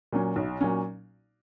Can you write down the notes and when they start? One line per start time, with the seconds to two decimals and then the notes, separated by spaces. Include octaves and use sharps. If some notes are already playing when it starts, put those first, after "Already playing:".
0.12 A#2 F#3 C#4
0.36 B1
0.61 A#2 F#3 C#4